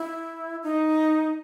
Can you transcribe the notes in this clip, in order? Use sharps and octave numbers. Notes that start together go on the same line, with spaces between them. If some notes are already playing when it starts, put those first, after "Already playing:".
Already playing: E4
D#4